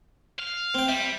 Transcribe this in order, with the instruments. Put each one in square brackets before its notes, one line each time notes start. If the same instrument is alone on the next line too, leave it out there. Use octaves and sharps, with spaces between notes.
[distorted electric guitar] F5
[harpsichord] C4 G5
[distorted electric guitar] G3 [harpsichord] E5